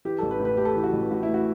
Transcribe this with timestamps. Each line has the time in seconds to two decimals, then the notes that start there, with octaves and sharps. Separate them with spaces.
0.05 E3 G4
0.19 A1 A4
0.31 B4
0.39 A2
0.45 B4
0.57 A3 G4
0.65 A4
0.74 E3 G4
0.84 F#4
0.93 A1
1.11 A2 F#4
1.23 E4
1.29 A3
1.34 F#4